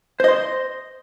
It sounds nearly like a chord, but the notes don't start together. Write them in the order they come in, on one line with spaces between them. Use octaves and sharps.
C5 D#5 C6